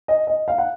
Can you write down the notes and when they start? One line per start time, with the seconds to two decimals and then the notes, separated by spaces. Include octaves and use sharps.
0.08 D#5
0.27 D#5
0.48 F5
0.58 F#5